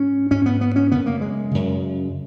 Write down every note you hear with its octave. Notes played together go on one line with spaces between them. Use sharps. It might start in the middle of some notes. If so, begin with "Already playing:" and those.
Already playing: G#2 C#4
G#2 C#4
B3
B3
C#4
F#2 C#3 B3
A#3
G#3
F#2 C#3